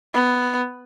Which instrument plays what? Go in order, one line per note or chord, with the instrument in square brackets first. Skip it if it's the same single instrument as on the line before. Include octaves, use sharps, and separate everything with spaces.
[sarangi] B3